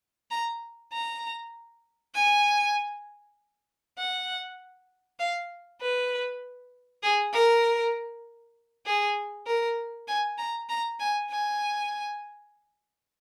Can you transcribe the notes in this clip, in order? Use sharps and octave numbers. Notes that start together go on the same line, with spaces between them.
A#5
A#5
G#5
F#5
F5
B4
G#4
A#4
G#4
A#4
G#5
A#5
A#5
G#5
G#5